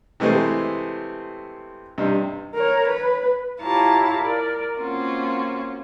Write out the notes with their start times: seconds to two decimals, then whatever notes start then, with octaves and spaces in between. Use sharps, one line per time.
0.20 C3 E3 G#3 A3 C4
1.98 G2 C3 D#4
2.55 A#4 C#5
2.88 B4
3.61 E4 F4 G4 C#5 A5 A#5
4.18 A#4 D5
4.79 A#3 C4 C#4 F4 F#4